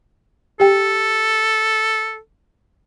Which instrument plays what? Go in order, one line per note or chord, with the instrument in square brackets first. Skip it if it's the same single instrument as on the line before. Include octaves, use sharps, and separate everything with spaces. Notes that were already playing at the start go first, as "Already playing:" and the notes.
[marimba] G4 G5 [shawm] A4